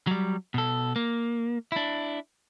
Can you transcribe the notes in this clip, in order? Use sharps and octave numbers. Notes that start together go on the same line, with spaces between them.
F#3 G3
B2 A4
A#3
D4 E4